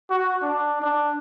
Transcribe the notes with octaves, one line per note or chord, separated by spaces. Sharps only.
F#4
D4
D4